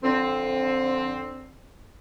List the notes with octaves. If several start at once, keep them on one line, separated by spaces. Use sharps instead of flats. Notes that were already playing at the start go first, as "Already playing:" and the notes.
F2 D3 C4